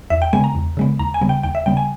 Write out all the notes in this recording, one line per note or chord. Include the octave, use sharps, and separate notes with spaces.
E2 E5
G5
C#3 G#3 B3 G#5
A#5
E2
C#3 G#3 B3
D#2 A#5
G#5
C#3 G3 B3
G5
D#2 G5
E5
C#3 G3 B3 G5
G#5